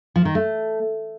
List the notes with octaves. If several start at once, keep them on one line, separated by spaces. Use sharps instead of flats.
F3
D#3
A3